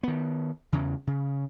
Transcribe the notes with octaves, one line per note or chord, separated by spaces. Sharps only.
D#3 B3
E2 C#3 E3
C#3